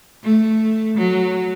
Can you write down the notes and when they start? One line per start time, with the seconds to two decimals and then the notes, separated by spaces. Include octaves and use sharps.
0.24 A3
0.98 F#3